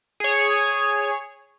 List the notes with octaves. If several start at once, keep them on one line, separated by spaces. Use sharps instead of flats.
G#4 C#5